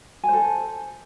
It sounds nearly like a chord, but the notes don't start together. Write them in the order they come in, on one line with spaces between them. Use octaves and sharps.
G#5 C5 A4